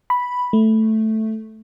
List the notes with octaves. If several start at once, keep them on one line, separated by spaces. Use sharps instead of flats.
B5
A3